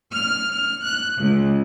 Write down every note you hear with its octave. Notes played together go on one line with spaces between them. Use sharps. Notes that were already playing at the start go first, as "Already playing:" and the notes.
F6
F6
F#6
C#2